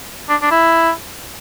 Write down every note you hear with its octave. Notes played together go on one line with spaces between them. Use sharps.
D4
D4
E4